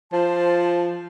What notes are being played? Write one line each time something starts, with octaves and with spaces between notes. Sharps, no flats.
F3 C5 A5